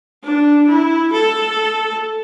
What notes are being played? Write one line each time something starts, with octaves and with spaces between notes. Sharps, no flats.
D4
E4
A4